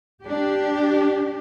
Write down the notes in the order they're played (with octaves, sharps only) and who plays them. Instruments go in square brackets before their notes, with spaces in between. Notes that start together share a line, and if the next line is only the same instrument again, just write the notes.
[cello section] D4 G4